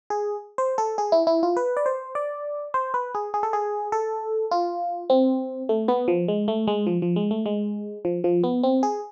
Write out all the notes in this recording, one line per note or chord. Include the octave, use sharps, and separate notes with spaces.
G#4
C5
A4
G#4
E4
E4
F4
B4
D5
C5
D5
C5
B4
G#4
G#4
A4
G#4
A4
F4
C4
A3
B3
F3
G#3
A3
G#3
F3
F3
G#3
A3
G#3
F3
F3
B3
C4
G#4